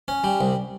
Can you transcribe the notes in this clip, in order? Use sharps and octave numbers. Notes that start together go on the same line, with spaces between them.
C#4
G3
C2